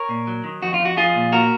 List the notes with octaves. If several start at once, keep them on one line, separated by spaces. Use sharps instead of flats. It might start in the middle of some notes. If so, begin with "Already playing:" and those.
Already playing: A#4 C#5
A#2
F#3
D#3
F2 F#4
F4
F2
F#4
F3 F4 G#4
A#2
A#3 F#4 A#4